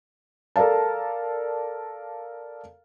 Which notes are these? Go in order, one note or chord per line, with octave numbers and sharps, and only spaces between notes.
A4 A#4 D5 F5 A5